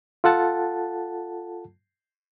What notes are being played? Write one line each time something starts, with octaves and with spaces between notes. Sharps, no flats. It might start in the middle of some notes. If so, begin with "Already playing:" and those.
F4 A4 F#5 A5